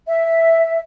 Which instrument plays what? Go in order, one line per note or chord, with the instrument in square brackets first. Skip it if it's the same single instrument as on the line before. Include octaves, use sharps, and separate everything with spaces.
[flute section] E5